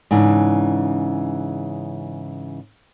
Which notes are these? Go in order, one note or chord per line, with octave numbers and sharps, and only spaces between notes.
G#2 C#3 E3 D4